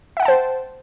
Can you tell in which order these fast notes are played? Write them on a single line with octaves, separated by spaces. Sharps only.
E5 F#5 G5 A5 C5